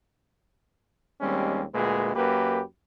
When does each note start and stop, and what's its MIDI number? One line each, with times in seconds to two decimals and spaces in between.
1.20 1.63 39
1.20 1.63 55
1.20 1.63 56
1.20 1.63 60
1.20 1.63 61
1.73 2.10 38
1.73 2.10 46
1.73 2.10 56
1.73 2.10 68
1.73 2.10 71
2.14 2.61 42
2.14 2.61 58
2.14 2.61 67
2.14 2.61 71